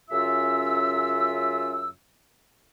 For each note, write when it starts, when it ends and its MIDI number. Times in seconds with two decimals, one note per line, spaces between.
0.10 1.90 42
0.10 1.90 49
0.10 1.90 61
0.10 1.90 65
0.10 1.90 76
0.10 1.90 88